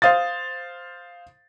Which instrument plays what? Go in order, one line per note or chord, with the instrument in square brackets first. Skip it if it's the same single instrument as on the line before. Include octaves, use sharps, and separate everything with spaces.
[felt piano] C5 F5 D#6 A6